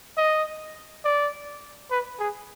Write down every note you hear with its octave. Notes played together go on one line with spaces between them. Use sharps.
D#5
D5
B4
G#4